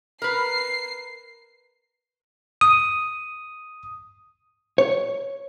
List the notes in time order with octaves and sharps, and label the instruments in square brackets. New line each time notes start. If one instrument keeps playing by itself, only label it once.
[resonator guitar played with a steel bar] A#4 B4 [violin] C7
[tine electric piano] D#6
[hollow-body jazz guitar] C#5